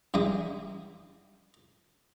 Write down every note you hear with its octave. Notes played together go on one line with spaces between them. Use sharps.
G2 E3 G#3 E5 D#6